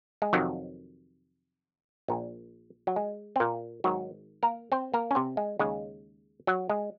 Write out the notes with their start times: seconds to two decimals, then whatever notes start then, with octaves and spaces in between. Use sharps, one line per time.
0.22 G#3
0.33 F2 C3 D#3 F#3
2.08 A#1 A#2
2.87 F#3
2.96 G#3
3.36 C4
3.40 A#2 A#3
3.84 G#1 G#2 D#3 F#3 F#4
4.43 A#3 A#4
4.72 C4 C5
4.94 A#3 A#4
5.11 C#4
5.15 C3 C4
5.37 G#3
5.59 D#2 C#3 G#3
6.47 F#3
6.69 G#3